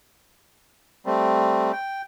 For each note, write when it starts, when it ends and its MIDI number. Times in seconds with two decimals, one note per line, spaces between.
1.06 1.72 55
1.06 1.72 57
1.06 1.72 60
1.73 2.02 79